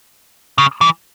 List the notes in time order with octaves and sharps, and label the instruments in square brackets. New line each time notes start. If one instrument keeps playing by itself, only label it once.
[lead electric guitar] C#3
E3